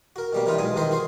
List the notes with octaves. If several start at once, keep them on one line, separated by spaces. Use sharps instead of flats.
F#4 A#4
B2 G3 A#3
C3 E3 G3 D#4 F4
B1 B2 G#3 G#5 D#6
C2 D#3 E3 A#4 C5 D#5
F#4 G#4 C5